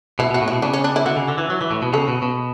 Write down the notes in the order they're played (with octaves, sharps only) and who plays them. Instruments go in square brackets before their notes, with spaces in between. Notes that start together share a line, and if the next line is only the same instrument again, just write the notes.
[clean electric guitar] B2 [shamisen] E4
[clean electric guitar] B2 [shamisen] F#4
[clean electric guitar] A2
[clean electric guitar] B2 [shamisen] E4
[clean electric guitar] C#3 [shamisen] D4
[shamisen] C#4
D4
E4
[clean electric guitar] D3 [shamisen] F#4
[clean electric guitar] C#3
D3
E3
F#3
E3
A2
B2
[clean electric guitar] C#3 [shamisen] A4
[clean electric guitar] B2
B2